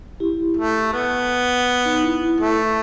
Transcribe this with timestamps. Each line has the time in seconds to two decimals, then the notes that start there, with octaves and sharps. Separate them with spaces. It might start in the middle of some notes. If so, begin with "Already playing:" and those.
0.20 E4 G4
0.57 A3
0.93 B3
1.85 D#4
2.03 E4
2.22 E4
2.40 A3